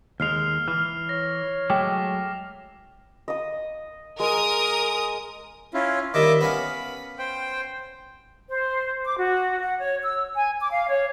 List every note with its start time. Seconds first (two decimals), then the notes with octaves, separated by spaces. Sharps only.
0.20 D#2 G#3 F6 C7 F7
0.68 E3 F6
1.09 C#5 A#6
1.70 F#3 G#3 A3 G5 D6
3.28 D#5 D#6
4.20 G#3 A#4 D#6
5.74 C#4 E4 F4
6.14 D#3 G3 A#3 D#5 E5 D6
6.41 B3 C#4 F5 B5
7.19 C5 G5
8.49 C5
9.05 D6
9.19 F#4
9.61 F#5
9.81 C#5
10.03 E6
10.34 G#5
10.59 D6
10.71 F5
10.89 C#5